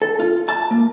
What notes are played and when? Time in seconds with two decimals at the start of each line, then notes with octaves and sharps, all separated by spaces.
0.02 A4
0.20 F4
0.49 A5
0.71 A#3